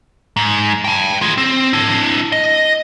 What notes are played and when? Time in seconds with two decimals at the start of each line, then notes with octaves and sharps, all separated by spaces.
0.36 G#2
0.85 G5 A5
1.22 F4 G#4
1.38 C4
1.73 D4 E4
2.32 D#5